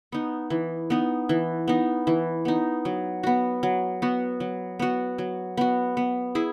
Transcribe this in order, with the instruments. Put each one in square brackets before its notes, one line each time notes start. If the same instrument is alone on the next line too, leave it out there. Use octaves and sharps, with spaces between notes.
[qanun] B3 D#4
E3
B3 D#4
E3
B3 D#4
E3
B3 D#4
F#3
B3 F#4
F#3
B3 F#4
F#3
B3 F#4
F#3
B3 F#4
B3
E4 G#4